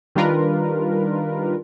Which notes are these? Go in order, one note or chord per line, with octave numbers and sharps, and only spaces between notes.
D#3 G3 D4 F4 A#4 B4